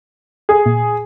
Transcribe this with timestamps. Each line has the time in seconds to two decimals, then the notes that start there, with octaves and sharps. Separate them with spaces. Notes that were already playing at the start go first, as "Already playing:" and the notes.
0.49 G#4
0.66 A#2